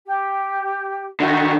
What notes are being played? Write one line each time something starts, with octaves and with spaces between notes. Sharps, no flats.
G4
D3 D#3 F#4 E5 C#6